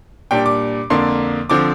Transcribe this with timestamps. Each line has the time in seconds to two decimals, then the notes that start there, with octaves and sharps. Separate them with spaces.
0.31 A#2 G3 D4 G5
0.46 D6
0.90 F2 D3 A#3 D4 C6
1.50 D3 F3 C4 D6